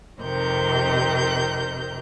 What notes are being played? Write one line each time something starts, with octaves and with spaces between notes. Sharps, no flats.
F2 C3 D#3 A#4 G6